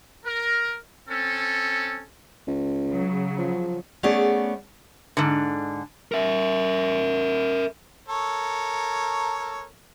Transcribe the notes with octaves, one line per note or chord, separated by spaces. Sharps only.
A#4
C4 C#4 A4
C#2
C#3 F#3
F3
A3 B3 C#4 G#4 D5
G#2 D3
A#4 E5
A4 A#4 C#5